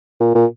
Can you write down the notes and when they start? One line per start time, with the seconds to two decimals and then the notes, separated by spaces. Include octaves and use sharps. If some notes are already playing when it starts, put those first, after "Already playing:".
0.20 A#2
0.35 A#2